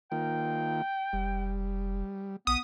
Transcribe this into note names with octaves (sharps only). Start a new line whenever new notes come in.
D#3 A#3 F4 G5
F1 G3
B1 B3 D#6